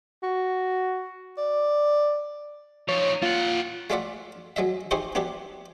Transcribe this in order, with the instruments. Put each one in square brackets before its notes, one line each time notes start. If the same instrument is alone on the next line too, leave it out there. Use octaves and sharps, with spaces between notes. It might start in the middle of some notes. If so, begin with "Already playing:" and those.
[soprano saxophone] F#4
D5
[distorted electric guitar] F3 D#4 [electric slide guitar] C#5
[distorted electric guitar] A#3 F#5 [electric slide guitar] F4
[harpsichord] G#3 A3 F4 D5 E5 F#5
F#3 G#3 D#5 E5
D#4 E4 G4 G#4 C5 C#6
B3 D4 E4 G4